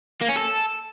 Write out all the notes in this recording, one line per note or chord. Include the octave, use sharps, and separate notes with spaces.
A#3
C#4
A4